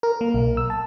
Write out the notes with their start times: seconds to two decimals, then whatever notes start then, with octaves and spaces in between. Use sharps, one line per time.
0.03 A#4
0.21 A#3
0.34 B1
0.57 E6
0.70 A5